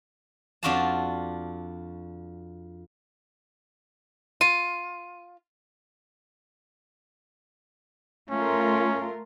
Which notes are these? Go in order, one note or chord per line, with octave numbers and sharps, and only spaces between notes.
F2 D4 F4 F#4 F5 A5
F4 D#7
A3 C#4 F4 A#4